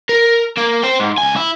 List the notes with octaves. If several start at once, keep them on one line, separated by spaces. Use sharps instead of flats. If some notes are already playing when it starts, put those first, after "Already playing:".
A#4
A#3
C5 G5
G#2
C#2 G#5
E4